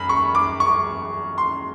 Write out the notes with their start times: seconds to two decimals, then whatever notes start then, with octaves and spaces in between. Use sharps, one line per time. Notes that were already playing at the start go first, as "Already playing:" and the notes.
Already playing: F#2 B5
0.09 C#6
0.35 D6
0.60 C#6
1.38 C6